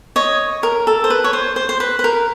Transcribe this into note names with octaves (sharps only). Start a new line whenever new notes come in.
C#5 D#5
A#4
A4
C5
B4
C#5
C5
C5
C5
B4
B4
A#4